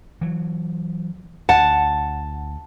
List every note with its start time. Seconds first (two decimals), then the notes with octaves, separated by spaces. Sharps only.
0.21 E3 F#3
1.49 D2 F#5 A5